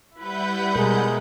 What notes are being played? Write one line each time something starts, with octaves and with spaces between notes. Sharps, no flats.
G3 E4 B4 F#5 G6
B2 G#3 A#4